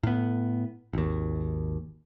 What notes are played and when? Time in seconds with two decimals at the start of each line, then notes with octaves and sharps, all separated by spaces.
0.03 A2 B3
0.93 G#1 D#2